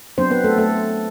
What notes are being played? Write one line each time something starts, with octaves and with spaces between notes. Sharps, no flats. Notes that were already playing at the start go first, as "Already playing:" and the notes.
F#3 B3 C4 D4 C5
B3 B4
A3 A4
A3 A4